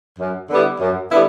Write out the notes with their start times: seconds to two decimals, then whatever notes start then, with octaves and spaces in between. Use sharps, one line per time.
0.19 F#2
0.50 D3 G3 B3 E4
0.80 F#2
1.11 D3 G3 B3 E4